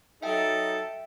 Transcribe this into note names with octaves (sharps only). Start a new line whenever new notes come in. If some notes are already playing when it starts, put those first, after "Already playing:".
F#3 D#4 A4 E5 G5